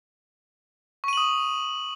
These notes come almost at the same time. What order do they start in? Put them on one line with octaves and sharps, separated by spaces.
C#6 D#7 F#7 D#6